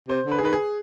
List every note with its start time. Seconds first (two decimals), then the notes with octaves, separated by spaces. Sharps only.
0.09 C3 C5
0.26 D3
0.31 B4
0.38 G#4
0.42 D#3 B4
0.53 G#4